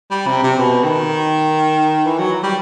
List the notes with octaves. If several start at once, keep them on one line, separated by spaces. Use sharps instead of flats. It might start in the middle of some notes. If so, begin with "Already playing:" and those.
G3
C3
C3
B2
D#3
E3
F#3
G3